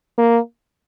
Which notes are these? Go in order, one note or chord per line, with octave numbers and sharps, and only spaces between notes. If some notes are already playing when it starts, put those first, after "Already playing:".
A#3